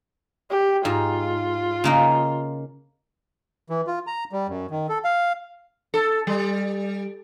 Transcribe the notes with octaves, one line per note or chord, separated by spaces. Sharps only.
G4
G#2 F4
C#3 A#3 D#4
E3
F4
A#5
G3
F#2
D#3
A4
F5
A4
G3